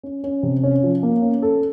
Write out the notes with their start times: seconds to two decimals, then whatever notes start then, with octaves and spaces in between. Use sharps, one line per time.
0.03 C#4
0.24 C#4
0.43 C3
0.63 C#4
0.83 F3
1.03 A#3
1.22 C#4
1.42 A4